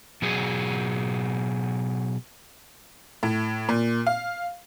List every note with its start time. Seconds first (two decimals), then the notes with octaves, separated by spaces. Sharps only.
0.22 B2 F#3 G#4
3.23 A2
3.69 A#2
4.07 F5